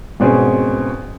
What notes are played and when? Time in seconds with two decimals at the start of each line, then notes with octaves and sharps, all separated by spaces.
0.20 G#1 B2 C4 C#4 G#4